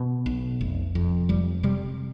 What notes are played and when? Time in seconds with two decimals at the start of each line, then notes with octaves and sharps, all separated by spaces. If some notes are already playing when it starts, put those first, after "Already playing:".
Already playing: B2
0.26 B1
0.61 F1
0.95 F2
1.29 F1 G3
1.63 C3 G3